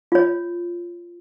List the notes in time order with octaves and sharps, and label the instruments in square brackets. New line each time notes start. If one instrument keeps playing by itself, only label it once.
[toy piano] F4 C#5